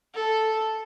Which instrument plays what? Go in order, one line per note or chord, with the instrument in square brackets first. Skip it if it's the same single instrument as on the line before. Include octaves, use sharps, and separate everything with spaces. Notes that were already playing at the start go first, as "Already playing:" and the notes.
[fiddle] A4